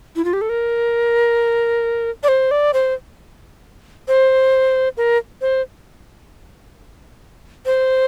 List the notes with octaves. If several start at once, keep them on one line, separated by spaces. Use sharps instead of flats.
E4
F4
G4
A4
A#4
D5
C5
D5
C5
C5
A#4
C5
C5